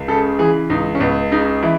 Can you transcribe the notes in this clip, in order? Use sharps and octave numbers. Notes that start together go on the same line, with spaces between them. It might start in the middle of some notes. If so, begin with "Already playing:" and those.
Already playing: C#2
C#3 A4
E3 G#4
C#2 D#4
C#4
C#2 B3
C#3 D#4
E3 E4